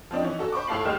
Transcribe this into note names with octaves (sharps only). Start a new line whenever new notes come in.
F3 C4 D4 D#4
E3 C#4 D#4
F#4 A4 A5
C5 B5 C#6 D6
A2 A4 F5 A5 C7 F#7
D#2 D#3 G#3 G4 F6 E7